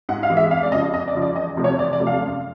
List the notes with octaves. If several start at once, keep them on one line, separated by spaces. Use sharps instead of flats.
G#2 F#5
F5
E3 G#3
E5
F2 F5
D5
C#3 F3 D#5
F2 D#5
D5
C#3 F3
D5
E2 D#5
C3 F3 A3
C#5
E2 D5
D5
C3 F3 A3
F5
F#2